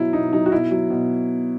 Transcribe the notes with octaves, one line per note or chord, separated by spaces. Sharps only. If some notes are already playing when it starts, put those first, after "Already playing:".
Already playing: B2 F#3 E4
B2 D#4
F#3 D#4
F#4
B2 E4
F#3
B2